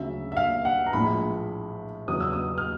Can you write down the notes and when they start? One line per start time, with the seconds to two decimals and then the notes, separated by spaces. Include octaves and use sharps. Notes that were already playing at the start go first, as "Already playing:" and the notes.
Already playing: D2 C#3 F#3 E5
0.32 E5
0.37 F5
0.65 F#5
0.86 A#5
0.93 A#1 A2 F3 G#3 B5
2.08 E2 C#3 F#3 D#6
2.20 E6
2.33 D#6
2.58 F6